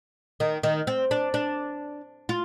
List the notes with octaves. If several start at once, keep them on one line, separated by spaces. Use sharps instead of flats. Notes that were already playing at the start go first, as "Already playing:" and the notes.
D#3
D#3
C4
D4
D4
F4